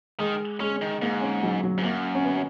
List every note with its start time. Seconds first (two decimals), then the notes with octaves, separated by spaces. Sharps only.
0.19 D#3 G#3
0.60 G#3 C#4
0.82 D#3
1.02 G#2 A#3
1.21 C#4
1.43 F#3
1.64 F#3
1.78 G#2
1.83 F#2 A#3
2.15 C#4
2.25 B3